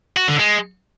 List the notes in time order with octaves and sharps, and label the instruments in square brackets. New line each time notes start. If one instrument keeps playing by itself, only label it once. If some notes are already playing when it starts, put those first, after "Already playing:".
[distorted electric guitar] F#4
D3
G#3